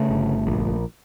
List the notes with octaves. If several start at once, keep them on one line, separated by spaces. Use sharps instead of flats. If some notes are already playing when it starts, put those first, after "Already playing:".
Already playing: C#3 A3
G1
A#1